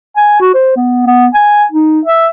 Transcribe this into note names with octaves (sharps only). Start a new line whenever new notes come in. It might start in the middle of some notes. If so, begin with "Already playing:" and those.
G#5
F#4
C5
B3
B3
G#5
D#4
E5